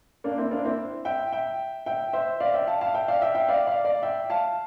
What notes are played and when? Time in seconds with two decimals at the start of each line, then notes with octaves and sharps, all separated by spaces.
0.24 A#3 D4
0.38 C4 E4
0.51 A#3 D4
0.65 C4 E4
1.05 E5 G5
1.32 E5 G5
1.86 E5 G5
2.13 C5 E5
2.40 D5 F5
2.54 E5 G5
2.67 F5 A5
2.81 F5 A5
2.94 E5 G5
3.08 D5 F5
3.22 E5 G5
3.35 E5 G5
3.48 D5 F5
3.67 D5 F5
3.85 D5 F5
4.03 E5 G5
4.30 F5 A5